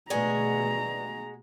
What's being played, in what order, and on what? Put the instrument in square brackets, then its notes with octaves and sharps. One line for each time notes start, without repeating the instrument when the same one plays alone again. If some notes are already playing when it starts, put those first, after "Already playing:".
[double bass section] B2 A3 [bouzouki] G#3 F#4 G#4 [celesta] B4 D5 [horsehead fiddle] A#5